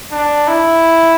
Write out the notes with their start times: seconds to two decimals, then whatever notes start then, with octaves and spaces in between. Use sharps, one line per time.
0.12 D4
0.47 E4